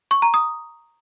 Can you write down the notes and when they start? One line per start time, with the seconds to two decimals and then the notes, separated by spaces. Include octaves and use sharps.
0.11 C#6
0.22 A#5
0.34 D#6